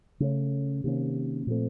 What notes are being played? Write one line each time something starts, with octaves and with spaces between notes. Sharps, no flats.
C#3 A3 C#4
C3 D#3 A#3 C#4
A#2 F3 A3 C4